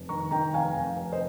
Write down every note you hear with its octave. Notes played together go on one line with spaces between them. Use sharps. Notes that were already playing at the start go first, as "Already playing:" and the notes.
Already playing: F1
D#3 A#5 C#6
D#3 G5 A#5
F1 F5 G#5
F1
F1
C5 D#5